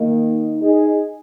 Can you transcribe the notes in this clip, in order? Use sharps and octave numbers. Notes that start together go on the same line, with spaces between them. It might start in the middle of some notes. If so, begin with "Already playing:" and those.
Already playing: D#3 A#3 D#4
D#4 G#4